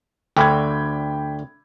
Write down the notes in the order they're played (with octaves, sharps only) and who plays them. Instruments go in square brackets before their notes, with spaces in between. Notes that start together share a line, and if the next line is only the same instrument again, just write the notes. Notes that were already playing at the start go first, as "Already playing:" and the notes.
[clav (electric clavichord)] D2 D3 [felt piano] G5 B5 G#6